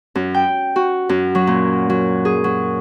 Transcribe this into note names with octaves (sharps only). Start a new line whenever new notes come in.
F#2
G5
F#4
F#2
F#3
A#2
F#3
G#4
F#3